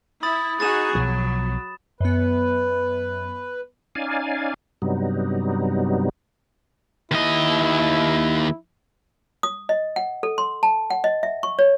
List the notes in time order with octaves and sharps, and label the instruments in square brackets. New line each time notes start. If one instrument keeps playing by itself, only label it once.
[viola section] E4 [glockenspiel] B5 D#6 A6
[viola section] D#4 F#4 G#4 [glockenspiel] A6 E7
[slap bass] B1 B2 F3 [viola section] F#3
[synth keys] F#2 B3 [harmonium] B4
[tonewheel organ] C#4 D#4 D5 F5 G#5
G2 C3 F#3 G3 B3 D#4
[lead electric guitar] D#2 D#5 [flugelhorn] E4
[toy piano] D#6
D#5
F#5
A4
C6
A5
F#5
D#5
E5
C#6
C#5